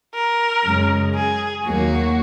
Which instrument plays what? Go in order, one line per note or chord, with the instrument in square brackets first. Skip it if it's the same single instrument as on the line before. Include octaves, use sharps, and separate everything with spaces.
[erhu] A#4
[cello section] F#2 C#3 G#3
[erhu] G#4
[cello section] D#2 D#3 F#3 A#3 [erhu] F#4